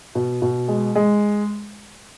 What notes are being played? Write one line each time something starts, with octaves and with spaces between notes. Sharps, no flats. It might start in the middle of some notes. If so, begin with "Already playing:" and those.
B2
B2
G#3
G#3